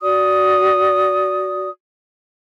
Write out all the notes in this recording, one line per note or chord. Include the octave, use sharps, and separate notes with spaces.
F#4 D5 D#6